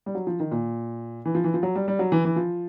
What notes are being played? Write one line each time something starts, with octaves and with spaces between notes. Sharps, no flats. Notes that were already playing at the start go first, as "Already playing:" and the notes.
G3
F#3
F3
D#3
A#2
E3
F3
E3
F3
F#3
G3
G3
F#3
E3
E3
F3